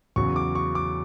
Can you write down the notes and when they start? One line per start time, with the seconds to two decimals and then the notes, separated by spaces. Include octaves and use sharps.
0.16 E2 C#3 F#3 C#6
0.36 D6
0.55 C#6
0.75 D6